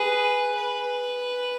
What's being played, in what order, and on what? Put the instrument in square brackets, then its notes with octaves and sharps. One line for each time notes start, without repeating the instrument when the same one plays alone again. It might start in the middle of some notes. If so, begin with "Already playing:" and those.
Already playing: [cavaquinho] G#4 [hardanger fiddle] B4
[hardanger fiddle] B4